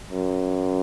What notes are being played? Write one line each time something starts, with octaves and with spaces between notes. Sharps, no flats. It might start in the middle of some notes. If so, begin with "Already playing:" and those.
F#2